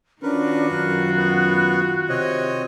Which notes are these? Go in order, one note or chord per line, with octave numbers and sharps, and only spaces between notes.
D#3 C#4 D4 F4 F#4 A#4 B4
F#2 F#6
B3
C3 C4 C#5 D#5